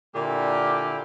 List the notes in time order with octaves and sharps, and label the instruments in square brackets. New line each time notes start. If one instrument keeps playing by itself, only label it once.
[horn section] A#2 D3 A#3 E4 G4